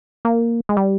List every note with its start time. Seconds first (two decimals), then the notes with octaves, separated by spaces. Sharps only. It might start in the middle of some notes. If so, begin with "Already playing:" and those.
0.25 A#3
0.69 G#3
0.77 G3